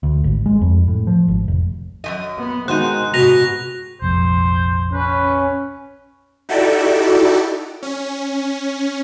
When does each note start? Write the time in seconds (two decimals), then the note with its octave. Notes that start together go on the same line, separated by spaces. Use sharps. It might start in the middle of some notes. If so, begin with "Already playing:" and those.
0.03 D2
0.24 G#1
0.46 G#3
0.61 F2
0.88 A2
1.07 F3
1.28 G#1
1.48 F1
2.04 F#2 C#3 D#5
2.37 B3
2.68 D#3 G#3 D#4 F#4 C5 F#6
3.14 G#2 C3 B3 F#4 A#6 F7
4.02 F1 A#1 F2 C5
4.94 C#4 B4
6.49 D#4 E4 F#4 G4 A4 D5
7.83 C#4